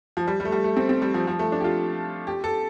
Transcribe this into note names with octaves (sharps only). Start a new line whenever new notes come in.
F3
G3
G3
A3
G3
A3
C4
C4
G3
F3
F3
A3
D4
G4
F4
G4
A4